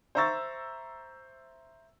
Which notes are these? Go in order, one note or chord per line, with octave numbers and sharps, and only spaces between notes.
C5 E5 A#5 C#6 E6 A6